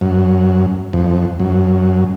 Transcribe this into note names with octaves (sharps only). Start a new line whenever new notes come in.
F#2
F2
F#2